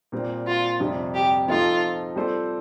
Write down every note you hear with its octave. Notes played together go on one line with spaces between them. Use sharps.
A#2 G3 C4
F4
F2 C3 G3
G4
F3 C4 D#4 F4 A4
G3 C4 F4 A4 C5